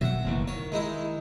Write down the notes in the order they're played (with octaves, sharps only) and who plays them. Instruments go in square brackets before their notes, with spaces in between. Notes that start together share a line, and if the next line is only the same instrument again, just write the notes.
[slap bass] B2 D#3 F#3 [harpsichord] E5 F#5
[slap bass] F#1 D#2 E3
[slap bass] D#3 [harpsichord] C#5
[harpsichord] G#3 D#4 E4